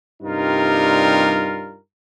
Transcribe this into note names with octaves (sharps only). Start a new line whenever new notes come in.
G2 C3 G3 D#4 F4 A#4